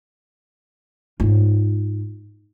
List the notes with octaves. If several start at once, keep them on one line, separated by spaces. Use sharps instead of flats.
G#2 F4